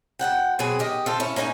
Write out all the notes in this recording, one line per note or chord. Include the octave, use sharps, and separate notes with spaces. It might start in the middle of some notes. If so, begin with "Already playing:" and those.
D2 G2 F#5 G5
B2 F#3 C4 G#4
D#3 G4 D#5
F4 A4 C5
C#4 E4
A#3 C#4 D#4 D5 G#5